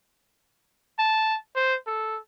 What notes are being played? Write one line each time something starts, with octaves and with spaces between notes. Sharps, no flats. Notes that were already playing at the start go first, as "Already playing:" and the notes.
A5
C5
A4